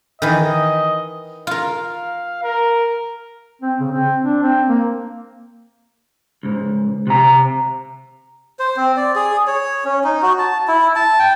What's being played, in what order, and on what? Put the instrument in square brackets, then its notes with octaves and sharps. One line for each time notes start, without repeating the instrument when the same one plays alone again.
[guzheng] D#3 E3 [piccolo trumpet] D#5
[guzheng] F4 A#4 [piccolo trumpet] F5
[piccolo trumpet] A#4
[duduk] C4
C#3
C4
D4
C4
A#3
[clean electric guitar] C#2 G#2
C3 A#5
[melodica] C5
C4
D5
G#4
C#5
C#4
D#4
F#4
A5
E4
A5
G5